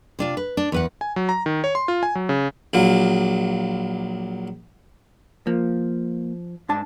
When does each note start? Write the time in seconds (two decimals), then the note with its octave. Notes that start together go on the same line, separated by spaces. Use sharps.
0.19 C3 D4 F4
0.37 B4
0.57 D4
0.72 E2 B4 F#5
1.01 G#5
1.16 F#3
1.29 A#5
1.46 D#3
1.64 C#5
1.75 C6
1.88 F4
2.03 G#5
2.15 F#3
2.29 C#3
2.74 A#1 A#2 F#3
5.47 F3 A#3
6.69 G#2 D4 A5